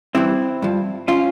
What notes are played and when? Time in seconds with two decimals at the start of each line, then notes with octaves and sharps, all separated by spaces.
0.15 G2 E3 C4 E4
0.62 G2 F3
1.08 F3 C#4 F4